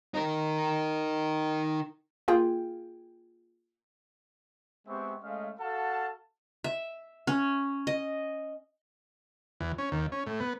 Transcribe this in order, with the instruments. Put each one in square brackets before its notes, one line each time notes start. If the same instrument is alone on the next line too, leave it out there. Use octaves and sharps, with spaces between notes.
[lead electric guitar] D#4 A#4
[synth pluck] A#3 F4 G#4 F5 G5
[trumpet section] G#3 B3 C4 G4 E5 C#6
G#3 A3 C#4 D#5 F5
F#4 A4 F5 F#5 A5
[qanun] E5
C#4
D#5
[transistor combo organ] E2
C#4
D#2
C#4
A2
B3